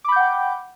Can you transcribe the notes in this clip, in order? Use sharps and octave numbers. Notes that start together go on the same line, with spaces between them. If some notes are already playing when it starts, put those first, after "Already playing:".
F#5 G5 B5 D6 G6